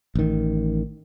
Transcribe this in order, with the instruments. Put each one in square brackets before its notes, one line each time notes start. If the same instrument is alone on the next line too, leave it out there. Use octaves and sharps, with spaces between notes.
[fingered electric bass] A1 D#3